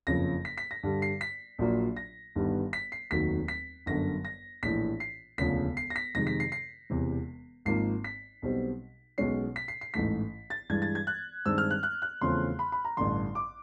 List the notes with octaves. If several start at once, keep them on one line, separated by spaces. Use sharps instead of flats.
F#1 F2 C#3 F3 A#6
B6
B6
A#6
G2 D3 G3
C7
B6
A#1 A#2 F#3 A#3
A#6
G1 G2 D#3 G3 B3
B6
C7
F1 D#2 D#3 F#3 B6
B6
G1 F#2 D3 A#6
A#6
A#1 A2 E3 B6
C7
E1 D2 C#3 F3 B6
C7
A#6
B6
F2 C3 D#3 G#3 A#6
B6
C7
C7
E1 E2 C3 E3
G#1 G#2 F3 A#3 C7
B6
B1 B2 G3 C4
B1 B2 G#3 C#4 C7
B6
C7
C7
A1 G#2 E3 A3 B6
A6
G2 E3 G#3 G#6
A6
G#6
F#6
G2 D#3 G#3 C4 E6
F6
F#6
F#6
F#6
E2 C#3 F3 A3 C4 C6
B5
B5
A#5
A1 G2 D3 C6
D6